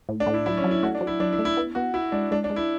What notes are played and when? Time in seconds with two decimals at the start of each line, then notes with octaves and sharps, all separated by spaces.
0.09 A2
0.20 D4
0.27 A2
0.34 E4
0.46 F#3 E4
0.57 C#4
0.64 F#3
0.71 E4
0.83 A3 F#4
0.95 D4
1.01 F#3
1.07 E4
1.20 F#3 D4
1.33 E4
1.39 A3
1.45 E4
1.57 B3
1.75 B3 F#4
1.94 E4 F#4
2.12 G#3 D4
2.31 G#3 D4
2.44 D4
2.50 G#3
2.56 E4